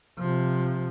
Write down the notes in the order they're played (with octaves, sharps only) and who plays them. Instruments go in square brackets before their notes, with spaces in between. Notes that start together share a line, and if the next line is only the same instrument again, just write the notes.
[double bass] C3 F3